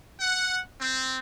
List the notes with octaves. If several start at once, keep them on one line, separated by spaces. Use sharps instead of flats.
F#5
C4